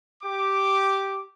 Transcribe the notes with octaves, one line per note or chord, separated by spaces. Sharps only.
G4 D6